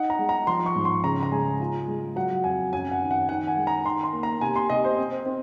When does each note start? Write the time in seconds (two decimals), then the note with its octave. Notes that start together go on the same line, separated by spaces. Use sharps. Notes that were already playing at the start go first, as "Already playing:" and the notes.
Already playing: D#4 F#5
0.10 A#5
0.19 G#3
0.29 A#5
0.47 F3 C6
0.66 C#6
0.76 G#2
0.85 C6
1.04 C#3 A#5
1.23 A#5
1.32 G#3 G#5
1.60 F4
1.88 G#3
2.16 F#3 F#5
2.44 F2 G#5
2.73 F#2 G#5
2.91 F#5
3.01 D#3
3.11 F#5
3.29 D#3 F#5
3.47 G#5
3.57 G#3
3.67 A#5
3.85 D#3 C6
4.03 C6
4.13 A#3
4.23 A#5
4.41 C3 G#5
4.56 C6
4.70 C3 D#5
4.84 C5
4.98 C4
5.26 C4